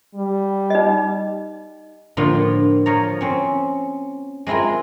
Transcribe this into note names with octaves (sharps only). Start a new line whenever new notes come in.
G3
D#4 D#5
A2 D3 F3 A#3 D4 F4
F3 C#5 A#5
C4 C#4
G#3 C4 E4 F4 A#4